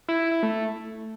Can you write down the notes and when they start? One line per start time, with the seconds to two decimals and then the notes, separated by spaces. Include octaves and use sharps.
0.09 E4
0.20 E4
0.31 E4
0.43 A3